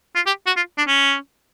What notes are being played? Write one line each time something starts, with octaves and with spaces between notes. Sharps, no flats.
F4
G4
F#4
F4
D4
C#4